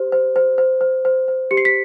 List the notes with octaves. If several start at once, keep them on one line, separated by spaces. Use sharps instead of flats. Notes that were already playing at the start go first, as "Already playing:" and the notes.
Already playing: G4 C5
C5
C5
C5
C5
C5
C5
G4 C#7
C7
B6